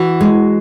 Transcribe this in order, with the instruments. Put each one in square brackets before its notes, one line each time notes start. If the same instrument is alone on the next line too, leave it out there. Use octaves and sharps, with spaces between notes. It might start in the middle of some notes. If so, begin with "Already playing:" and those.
Already playing: [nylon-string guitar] E3 [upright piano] F#4
[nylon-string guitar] G#3